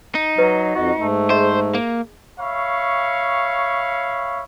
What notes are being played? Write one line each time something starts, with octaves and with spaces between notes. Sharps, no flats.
D#4
F#3 B4 D#5
F2 F#4 D#5
G#2 A3
G#4 C5 D#5 E5
A#3
C#5 E5 F5 B5 C#6